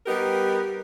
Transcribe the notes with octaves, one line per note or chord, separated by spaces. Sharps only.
G3 B3 D#4 G4 A#4